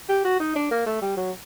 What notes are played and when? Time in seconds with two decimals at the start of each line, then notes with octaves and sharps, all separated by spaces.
0.09 G4
0.24 F#4
0.40 D#4
0.55 D4
0.71 A#3
0.86 A3
1.02 G3
1.17 F#3